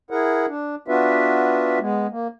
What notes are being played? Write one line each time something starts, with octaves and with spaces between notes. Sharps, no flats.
E4 G#4 A#4 F#5
D4
B3 D4 F4 F#4 B4 E5
G#3 B3
A#3